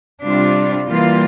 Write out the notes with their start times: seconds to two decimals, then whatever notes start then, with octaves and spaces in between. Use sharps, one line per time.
0.24 C3 G3 D4 F4
0.88 E3 G3 A#3 F4